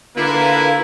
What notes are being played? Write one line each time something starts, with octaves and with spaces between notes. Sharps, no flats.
D3 A#3 E4 F4 B4